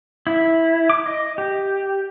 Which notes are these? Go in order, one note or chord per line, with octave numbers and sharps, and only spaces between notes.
E4
D6
D#5
G4